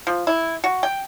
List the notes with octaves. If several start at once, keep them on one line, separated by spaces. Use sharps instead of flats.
F3
E4
F#4
G5